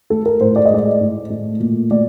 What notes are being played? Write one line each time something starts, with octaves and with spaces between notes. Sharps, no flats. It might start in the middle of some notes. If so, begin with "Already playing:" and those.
A3 A4
A#4
A2 C5
D5
D#5
G#3 D5
A2
A3
A#2
A3 D5